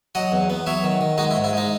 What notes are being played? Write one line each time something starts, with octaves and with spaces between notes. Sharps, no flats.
F#3 D#5 F#5
E2
B3
F#3 C#5 E5
D#3
D#3
G#3 D#4 F#4
E4
G#2
E4
G#3 D#4